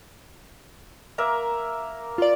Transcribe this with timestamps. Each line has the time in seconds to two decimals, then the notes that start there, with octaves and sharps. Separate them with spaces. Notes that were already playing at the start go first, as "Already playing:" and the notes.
1.18 A#3 A#4 E5
2.18 F4 D5